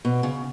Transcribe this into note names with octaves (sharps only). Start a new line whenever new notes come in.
B2
C#3